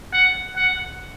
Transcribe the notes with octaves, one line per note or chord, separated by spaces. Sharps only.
F#5
F#5